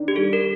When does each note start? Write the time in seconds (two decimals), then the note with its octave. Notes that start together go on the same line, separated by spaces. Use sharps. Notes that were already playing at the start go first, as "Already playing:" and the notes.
Already playing: D#3 D4
0.08 G4
0.16 G3 A4
0.33 A#4